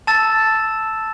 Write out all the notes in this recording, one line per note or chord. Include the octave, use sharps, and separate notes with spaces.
A5 E6 A6 E7